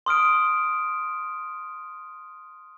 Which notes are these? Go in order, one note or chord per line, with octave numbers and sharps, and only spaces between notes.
C6 D#6 F6 D7